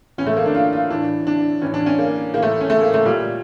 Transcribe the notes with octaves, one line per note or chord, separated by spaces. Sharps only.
A2 E3 C#4
A3
A#3
D4
F4
F4
A2 E3 D4
D4
A2 E3 C#4
D4
C#4
A#3
A2 E3 A#3
A3
C#4
A3
A#3
A3
A#2 G3